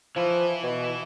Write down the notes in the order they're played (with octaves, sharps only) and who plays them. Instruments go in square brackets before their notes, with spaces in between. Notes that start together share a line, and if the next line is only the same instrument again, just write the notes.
[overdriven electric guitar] E3 E4 [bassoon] F3
[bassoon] B2